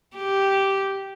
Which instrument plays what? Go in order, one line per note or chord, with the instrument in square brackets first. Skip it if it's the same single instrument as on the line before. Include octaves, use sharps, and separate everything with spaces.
[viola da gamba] G4